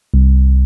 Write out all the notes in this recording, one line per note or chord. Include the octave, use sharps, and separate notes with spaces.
C2